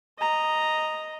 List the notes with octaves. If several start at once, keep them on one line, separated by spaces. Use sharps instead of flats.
D#5 A#5